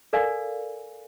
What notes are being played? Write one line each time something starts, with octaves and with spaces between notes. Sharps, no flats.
A4 A#4 D5 F5 G#5